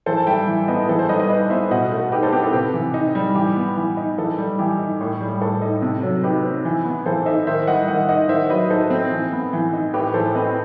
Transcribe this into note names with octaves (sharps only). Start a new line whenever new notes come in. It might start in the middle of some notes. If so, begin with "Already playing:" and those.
E3 A4 C5
A5
G3 E5 G5
E3
B3 B4 D#5
E3 A4
A4 C5
G3 B4 D#5
B4 D#5
D#4 B4 D#5
B3 C5 E5
B2 D#5 F#5
A3
D#4 G4 B4
A4 C5
C4 G4 B4
A4
C3 G4 B4
E3
D#4
G3
E3 G4
B3
E3
D#4
E3 A4
G3
E3 G4
D#4
A2
G3
A2 A4
D#4
C3
F#3
D#4 G4 B4
C4
E3
B3
E3 A4 C5
D#4 C5 E5
D#3 C5 E5
G3 D#5 F#5
D#3 D#5 F#5
D#4 D#5 F#5
D#3 C5 E5
F#3 B4 D#5
D#4 A4 C5
C4
E3
B3
E3
D#4
A2 G4 B4
E3 A4 C5
C4 B4 D#5